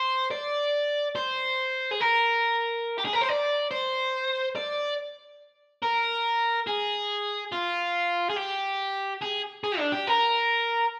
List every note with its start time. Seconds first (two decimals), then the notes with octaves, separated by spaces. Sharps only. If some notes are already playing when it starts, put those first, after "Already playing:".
Already playing: C5
0.31 D5
1.16 C5
1.91 G#4
2.01 A#4
2.98 G4
3.05 G#4
3.13 A#4
3.21 C5
3.29 D5
3.71 C5
4.55 D5
5.83 A#4
6.67 G#4
7.52 F4
8.30 G#4
8.36 G4
9.22 G#4
9.64 G#4
9.78 D4
9.92 G4
10.07 A#4